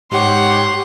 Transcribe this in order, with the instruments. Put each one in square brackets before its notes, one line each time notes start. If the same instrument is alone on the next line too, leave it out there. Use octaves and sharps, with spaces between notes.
[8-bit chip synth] G#2 C#5 [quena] G4 [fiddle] F#5 [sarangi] C6